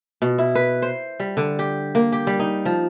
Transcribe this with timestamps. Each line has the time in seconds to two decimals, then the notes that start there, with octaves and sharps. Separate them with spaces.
0.22 B2
0.38 E4
0.55 B4
0.82 C5
1.20 G3
1.37 D3
1.59 G4
1.95 A#3
2.12 G4
2.27 G3
2.40 D#4
2.65 F3